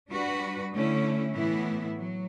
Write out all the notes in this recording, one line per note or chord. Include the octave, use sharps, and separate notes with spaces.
G3 D4 F#4 B4
D3 A3 C#4 E4
A2 E3 B3 E4
F#3